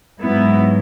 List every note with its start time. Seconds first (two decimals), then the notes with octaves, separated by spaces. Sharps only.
0.21 G#2 F#3 B3 E4